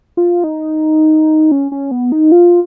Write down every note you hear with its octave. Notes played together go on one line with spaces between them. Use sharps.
F4
D#4
C#4
C#4
B3
D#4
F4